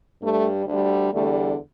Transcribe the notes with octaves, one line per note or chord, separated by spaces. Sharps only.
G2 G3 A3
D2 D3 G3
E2 D3 G3 A3